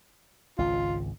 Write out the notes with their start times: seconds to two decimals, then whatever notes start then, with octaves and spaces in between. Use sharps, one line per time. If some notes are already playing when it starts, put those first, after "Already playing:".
0.58 G#1 C#2 F4